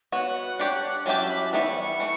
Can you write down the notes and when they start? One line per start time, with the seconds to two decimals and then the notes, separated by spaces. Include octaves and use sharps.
0.12 B3 F#4 C#5 F#5
0.59 D4 G4 C#5
1.06 F#3 C#4 E4 G4 A5
1.29 B5
1.53 E3 G3 B3 E4 C#6
2.00 E3 A3